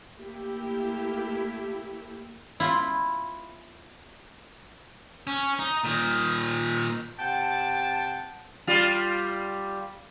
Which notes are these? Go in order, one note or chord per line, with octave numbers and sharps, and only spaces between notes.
A3 A#3 E4 G4
E4 F4
C#4
D#4
A#2 D#3
C3 F#5 G5 A5
G3 F4